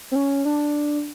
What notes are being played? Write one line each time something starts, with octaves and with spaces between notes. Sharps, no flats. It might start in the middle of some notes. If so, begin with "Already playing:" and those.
C4
C#4
D4